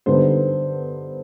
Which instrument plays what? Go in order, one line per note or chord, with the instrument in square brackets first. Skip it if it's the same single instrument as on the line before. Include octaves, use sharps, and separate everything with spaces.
[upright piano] G2 D3 G3 B3 D#4 C5